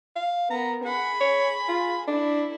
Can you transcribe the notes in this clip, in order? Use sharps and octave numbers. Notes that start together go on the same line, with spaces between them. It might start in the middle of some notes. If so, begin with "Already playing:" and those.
F5
B3 A#4 A#5
G#4 F#5 B5
C#5
F4
D4 E4 A4